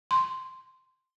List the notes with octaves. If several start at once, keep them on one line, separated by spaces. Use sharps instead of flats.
C6